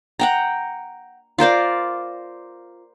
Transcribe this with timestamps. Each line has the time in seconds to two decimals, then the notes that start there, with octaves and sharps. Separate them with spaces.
0.19 F#5 G5 A#5
1.38 F4 A#4 C5 D5